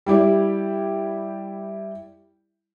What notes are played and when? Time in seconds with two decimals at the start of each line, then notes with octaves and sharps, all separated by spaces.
0.06 G3 E4 G4 D5